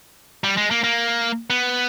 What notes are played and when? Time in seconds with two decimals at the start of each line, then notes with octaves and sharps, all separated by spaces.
0.44 G3
0.57 G#3
0.71 A#3
0.84 A#3
1.50 B3